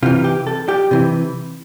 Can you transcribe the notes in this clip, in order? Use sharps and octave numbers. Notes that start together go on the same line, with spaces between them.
C3 E3 F4
G4
A4
G4
C3 E3